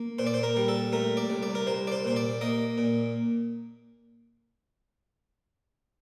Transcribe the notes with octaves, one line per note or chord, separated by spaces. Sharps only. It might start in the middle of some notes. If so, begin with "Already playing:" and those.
Already playing: A#3
A#2 C5
D5
C5
A#4
G3
A4
A3 A#4
D5
C2
D5
A#4
C2 C5
D5
C5
A#2 C5
D5
A#3 D#5
A#2